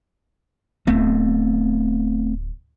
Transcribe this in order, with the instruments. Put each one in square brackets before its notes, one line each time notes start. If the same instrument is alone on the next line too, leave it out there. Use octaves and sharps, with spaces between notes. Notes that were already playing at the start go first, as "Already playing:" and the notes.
[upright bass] D1 [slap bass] A3 B3 C4